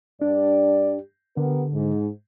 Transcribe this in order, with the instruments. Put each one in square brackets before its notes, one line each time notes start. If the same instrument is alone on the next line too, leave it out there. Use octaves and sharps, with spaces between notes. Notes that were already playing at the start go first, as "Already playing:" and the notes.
[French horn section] G2 G4 D5 [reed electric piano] D4
[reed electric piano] D3 [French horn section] B3 G4 A#4
[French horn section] G#2